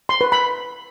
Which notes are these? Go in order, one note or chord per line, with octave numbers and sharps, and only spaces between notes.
C6
B4
B5